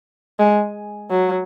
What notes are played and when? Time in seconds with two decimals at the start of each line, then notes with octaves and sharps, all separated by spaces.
0.39 G#3
1.10 F#3